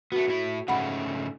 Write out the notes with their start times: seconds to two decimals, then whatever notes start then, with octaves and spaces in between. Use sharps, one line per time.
0.12 A3 B3 F#4
0.28 A2 E4
0.68 G#2 C#3 A3 F#5 B5